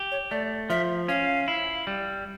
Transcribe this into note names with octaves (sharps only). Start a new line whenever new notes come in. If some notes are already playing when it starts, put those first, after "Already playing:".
Already playing: G4
C#5
A3 D5
F3 E5
C#4 F5
E4
G3